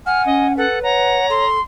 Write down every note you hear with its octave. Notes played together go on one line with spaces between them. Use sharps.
F#5 G#5 F6
C#4 D#5
A4 B4 F#5
C#5 F#5 A#5
A4 C6